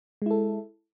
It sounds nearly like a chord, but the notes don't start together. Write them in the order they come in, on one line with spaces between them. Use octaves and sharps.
G#3 E4 A4